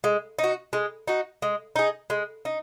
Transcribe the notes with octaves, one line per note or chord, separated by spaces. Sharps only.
G#3
D#4
F#4
G#3
D#4 F#4
G#3
D#4 G#4
G#3
D#4